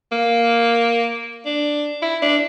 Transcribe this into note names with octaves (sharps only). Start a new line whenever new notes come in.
A#3
D4
E4
D4